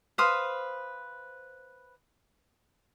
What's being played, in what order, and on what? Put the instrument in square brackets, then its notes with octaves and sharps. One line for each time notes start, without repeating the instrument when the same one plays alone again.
[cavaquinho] B4 C5 F5 D#6